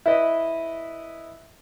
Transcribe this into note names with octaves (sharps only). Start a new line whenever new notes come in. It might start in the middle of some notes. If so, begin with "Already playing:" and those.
E4 B4 D#5